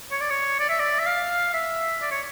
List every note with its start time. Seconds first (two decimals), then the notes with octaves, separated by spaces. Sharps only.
0.11 C#5
0.21 D5
0.30 C#5
0.59 D5
0.69 E5
0.80 D5
0.99 E5
1.06 F5
1.54 E5
2.02 D5
2.11 C#5